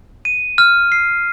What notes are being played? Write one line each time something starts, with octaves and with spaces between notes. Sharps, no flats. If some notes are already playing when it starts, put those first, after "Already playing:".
D#7
F6
C7